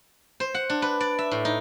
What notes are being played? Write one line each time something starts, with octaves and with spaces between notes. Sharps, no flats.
C5
F#5
D4
B4
D5
E5
A2
D#4